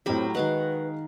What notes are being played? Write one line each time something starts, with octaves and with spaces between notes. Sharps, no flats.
A2 F#3 C4 G4 A#4 B5
D#3 G#3 F#4 B4 F5 F#5